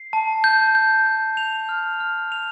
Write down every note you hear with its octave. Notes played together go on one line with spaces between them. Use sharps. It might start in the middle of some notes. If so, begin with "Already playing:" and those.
Already playing: C7
A5
G6
G6
G6
F7
F6
F6
F7